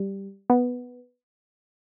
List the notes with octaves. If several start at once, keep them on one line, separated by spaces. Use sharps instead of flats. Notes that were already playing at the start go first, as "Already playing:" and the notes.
Already playing: G3
B3